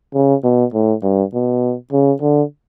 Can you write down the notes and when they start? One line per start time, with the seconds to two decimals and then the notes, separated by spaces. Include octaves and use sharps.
0.14 C#3
0.44 B2
0.74 A2
1.03 G2
1.33 B2
1.92 C#3
2.22 D3